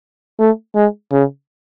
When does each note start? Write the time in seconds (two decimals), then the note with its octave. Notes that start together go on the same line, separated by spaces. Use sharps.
0.40 A3
0.75 G#3
1.12 C#3